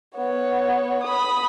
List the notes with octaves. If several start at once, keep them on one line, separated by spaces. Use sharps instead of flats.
B3 C#5
B5 D#6